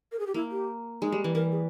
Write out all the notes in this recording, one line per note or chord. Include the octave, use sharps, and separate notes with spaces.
A#4
G#4
G4
A#3 E4
G4
G#3 D#4
G3
E3
E3 A#4
G#4